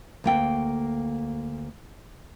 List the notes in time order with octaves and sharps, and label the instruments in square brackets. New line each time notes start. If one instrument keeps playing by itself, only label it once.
[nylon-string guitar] D2 A#3 G5